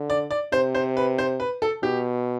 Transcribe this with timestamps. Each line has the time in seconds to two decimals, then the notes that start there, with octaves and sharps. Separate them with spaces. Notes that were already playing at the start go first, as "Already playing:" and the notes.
Already playing: D3
0.10 D5
0.31 D5
0.52 C3 C5
0.75 C5
0.97 B4
1.18 C5
1.40 B4
1.62 A4
1.83 B2 G4